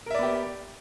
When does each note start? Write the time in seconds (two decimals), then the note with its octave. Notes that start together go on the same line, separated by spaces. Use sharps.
0.06 A#4
0.10 E5
0.15 D5
0.19 B3
0.23 G4